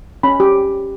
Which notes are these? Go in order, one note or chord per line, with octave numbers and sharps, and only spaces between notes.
C#4 B5
G4